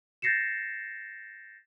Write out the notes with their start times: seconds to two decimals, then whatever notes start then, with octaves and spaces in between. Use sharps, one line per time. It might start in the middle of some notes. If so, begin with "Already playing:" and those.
0.22 G6 A6 A#6 C7 C#7 E7